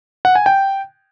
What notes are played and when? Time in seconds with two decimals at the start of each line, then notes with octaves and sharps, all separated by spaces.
0.25 F#5
0.35 G#5
0.46 G5